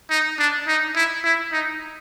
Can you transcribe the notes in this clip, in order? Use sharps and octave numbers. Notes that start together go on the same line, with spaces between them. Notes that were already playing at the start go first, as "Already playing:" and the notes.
D#4
D4
D#4
E4
E4
D#4